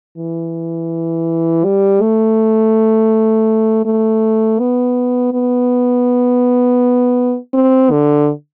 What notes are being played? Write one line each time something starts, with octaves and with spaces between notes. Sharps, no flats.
E3
G3
A3
A3
B3
B3
C4
D3